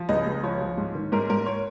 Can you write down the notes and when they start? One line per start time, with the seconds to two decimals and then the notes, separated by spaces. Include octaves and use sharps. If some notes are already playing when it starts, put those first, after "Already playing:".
Already playing: F3
0.09 C#2 D#5
0.26 C#2
0.43 F3 C#5
0.61 F3
0.77 G#2
0.95 D#3
1.12 G#2 A#4
1.30 G#2 A#4
1.46 C#5